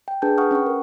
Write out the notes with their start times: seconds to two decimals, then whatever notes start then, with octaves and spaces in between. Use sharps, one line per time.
0.08 G5
0.22 D4 G#4 B4 G#5 A5 G6
0.38 B4 F#5 C#6 D#6 F6
0.51 C#4 F#5 G5 C#6
0.66 A#4